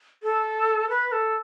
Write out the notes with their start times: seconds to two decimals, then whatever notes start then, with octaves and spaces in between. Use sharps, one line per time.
0.23 A4
0.89 B4
1.12 A4